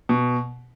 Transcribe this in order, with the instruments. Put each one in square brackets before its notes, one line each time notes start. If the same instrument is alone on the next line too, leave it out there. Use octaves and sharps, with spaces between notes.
[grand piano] B2